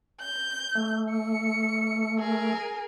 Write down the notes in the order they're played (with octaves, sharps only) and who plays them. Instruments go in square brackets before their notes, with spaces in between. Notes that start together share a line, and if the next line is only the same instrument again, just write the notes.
[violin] G6
[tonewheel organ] A3
[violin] C#7
G#4 A#4